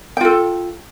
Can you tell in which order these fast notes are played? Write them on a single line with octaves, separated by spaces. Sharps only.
G5 F4 A4